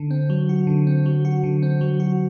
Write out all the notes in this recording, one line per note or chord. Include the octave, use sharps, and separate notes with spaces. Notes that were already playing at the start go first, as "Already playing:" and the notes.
Already playing: D3
C4
F#3
F#4
D3
C4
F#3
F#4
D3
C4
F#3
F#4